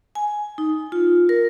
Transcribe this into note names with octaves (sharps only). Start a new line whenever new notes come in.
G#5
D#4
F4
A#4